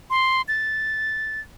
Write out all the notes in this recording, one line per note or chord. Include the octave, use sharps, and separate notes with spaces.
C6
A6